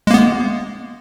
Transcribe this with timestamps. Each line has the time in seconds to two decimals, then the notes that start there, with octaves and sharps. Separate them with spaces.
0.07 G#3
0.11 A#3
0.14 B3